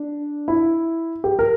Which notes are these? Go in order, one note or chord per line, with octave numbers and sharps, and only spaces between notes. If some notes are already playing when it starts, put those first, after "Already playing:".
Already playing: D4
E4
G4
A#4